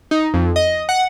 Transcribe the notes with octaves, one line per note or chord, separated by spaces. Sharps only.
D#4
F2
D#5
F#5